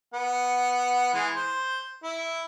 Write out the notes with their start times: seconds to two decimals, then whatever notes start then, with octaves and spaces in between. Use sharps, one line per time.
0.14 B3 F#5
1.14 E3 G#3
1.35 C5
2.03 E4